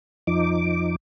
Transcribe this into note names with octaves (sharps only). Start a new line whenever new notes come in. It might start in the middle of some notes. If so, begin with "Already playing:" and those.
F2 F3 D#4 D6